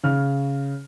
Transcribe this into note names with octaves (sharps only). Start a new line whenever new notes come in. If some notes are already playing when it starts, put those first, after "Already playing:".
C#3 F6